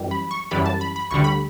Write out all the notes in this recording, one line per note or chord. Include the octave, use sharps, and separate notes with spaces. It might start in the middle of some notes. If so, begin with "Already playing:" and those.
Already playing: F#2 E3 G3
B5
C#6
F#2 E3 G3 B5
A5
B5
B5
D2 D3 G3 C#6
B5